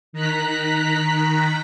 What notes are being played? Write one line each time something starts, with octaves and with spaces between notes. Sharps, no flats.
D#3 A#5 F#6 B6